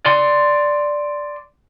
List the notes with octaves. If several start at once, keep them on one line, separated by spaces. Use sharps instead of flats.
D5 C6